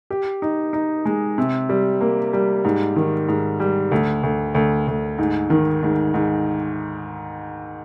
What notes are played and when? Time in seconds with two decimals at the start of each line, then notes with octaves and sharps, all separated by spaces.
0.10 G4
0.42 D#4
0.73 D#4
1.05 G#3
1.38 C3
1.69 G3
2.01 A#3
2.33 G3
2.64 G#2
2.96 D#3
3.28 G#2
3.60 G3
3.91 D2
4.23 D2
4.55 D2
4.88 D2
5.18 G#2
5.50 D#3
5.83 G#2
6.14 G#2